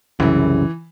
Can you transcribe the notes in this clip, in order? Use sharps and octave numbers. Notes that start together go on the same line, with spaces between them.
C2 F#2 C#3 E3